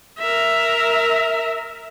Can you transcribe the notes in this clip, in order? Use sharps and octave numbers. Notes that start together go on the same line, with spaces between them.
A#4 E5